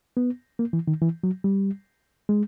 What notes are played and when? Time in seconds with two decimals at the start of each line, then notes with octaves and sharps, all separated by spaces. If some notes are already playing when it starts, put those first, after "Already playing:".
0.17 B3
0.59 A#3
0.73 E3
0.88 D#3
1.02 E3
1.24 F#3
1.44 G3
2.29 G#3